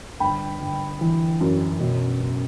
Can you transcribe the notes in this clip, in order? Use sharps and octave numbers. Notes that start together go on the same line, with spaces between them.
G1 G5 B5
G1
E3
F#2
B2
F#1